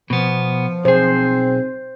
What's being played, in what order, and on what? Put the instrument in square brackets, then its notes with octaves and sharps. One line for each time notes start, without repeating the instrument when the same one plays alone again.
[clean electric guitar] B2 B3 [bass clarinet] F3
[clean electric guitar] B1 G#4 [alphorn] C4 [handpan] C5